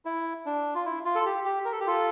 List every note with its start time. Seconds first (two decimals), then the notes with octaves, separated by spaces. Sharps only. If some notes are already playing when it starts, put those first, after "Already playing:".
0.05 E4
0.46 D4
0.75 F4
0.85 E4
1.05 F4
1.15 A4
1.26 G4
1.45 G4
1.65 A#4
1.72 A4
1.80 G4
1.87 F4 A4